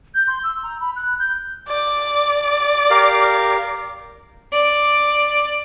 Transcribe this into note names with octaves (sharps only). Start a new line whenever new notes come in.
G6
C6
E6
A#5
B5
F#6
G6
D5
G4 A#4 F5
D5